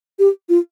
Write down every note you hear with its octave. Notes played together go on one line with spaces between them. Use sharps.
G4
F4